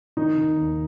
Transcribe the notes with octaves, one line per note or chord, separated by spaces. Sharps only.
D#3 D#4
D#3
D#2